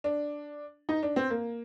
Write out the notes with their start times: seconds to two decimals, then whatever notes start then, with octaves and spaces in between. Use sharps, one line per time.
0.04 D4
0.89 D#4
1.03 D4
1.16 C4
1.30 A#3